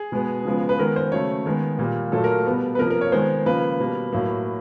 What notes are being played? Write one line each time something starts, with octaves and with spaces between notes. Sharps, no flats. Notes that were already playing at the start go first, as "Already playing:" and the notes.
Already playing: G#4
B2 G#3 B3
C#3 F3 G#3 B3
B4
D#3 G#3 B3 A#4
C5
C#3 F#3 A3 C#5
D#3 G#3 B3
A#2 G3 A#3
A#2 F#3 A3 A4
A#4
B2 G3 B3
B4
C3 F3 A#3 A#4
A#4
C#5
D#3 G#3 B3 C5
C#3 F3 A#3 B4
B2 G3 A#3
A2 F#3 A#3